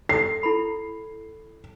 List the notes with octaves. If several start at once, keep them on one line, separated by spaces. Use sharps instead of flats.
A4 D#6 C7
E4 A4 B5